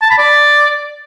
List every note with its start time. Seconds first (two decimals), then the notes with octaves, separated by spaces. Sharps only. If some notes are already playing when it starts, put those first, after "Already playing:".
0.02 A5
0.10 B5
0.18 D5